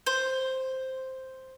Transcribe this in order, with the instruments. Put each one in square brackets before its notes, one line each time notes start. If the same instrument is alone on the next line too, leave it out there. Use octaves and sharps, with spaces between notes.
[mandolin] C5